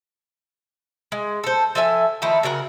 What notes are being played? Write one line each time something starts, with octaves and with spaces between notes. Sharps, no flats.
G#3
A4 C5
F3 A4 E5 G#5
D#3 F3 A3 E4
C#3 F#3 A#4 F#5